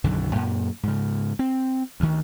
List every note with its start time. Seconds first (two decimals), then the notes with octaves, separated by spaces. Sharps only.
0.04 B1 F#2 D3 D#3
0.35 F#2 A#2
0.83 G#2 C#3
1.39 C4
2.00 D2 D#3